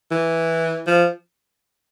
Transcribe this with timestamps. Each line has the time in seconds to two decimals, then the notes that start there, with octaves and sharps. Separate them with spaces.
0.11 E3
0.87 F3